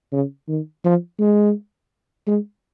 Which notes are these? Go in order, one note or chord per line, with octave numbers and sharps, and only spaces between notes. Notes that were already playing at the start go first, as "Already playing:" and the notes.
C#3
D#3
F3
G#3
G#3